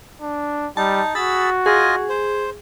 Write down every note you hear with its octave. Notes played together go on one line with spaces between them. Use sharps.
D4
G3 D#4 A5
F#4 G#4 B5 E6 A6
F4 G#4 D#5 G#5
C5